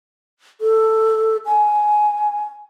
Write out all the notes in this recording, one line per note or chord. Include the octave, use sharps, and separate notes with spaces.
A4
G#5